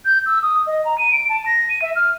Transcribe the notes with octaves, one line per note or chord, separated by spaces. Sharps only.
G6
E6
D#6
D#5
A#5
D#7
D7
A5
A#6
D#7
E5
F6